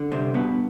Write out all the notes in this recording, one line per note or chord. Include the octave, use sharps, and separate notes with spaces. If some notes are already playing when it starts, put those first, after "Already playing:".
Already playing: D3
G2 C3 C4
G2 B2 B3